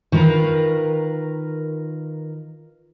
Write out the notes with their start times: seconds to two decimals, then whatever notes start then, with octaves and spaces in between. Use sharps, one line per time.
0.12 D#3 F4 A#4 B4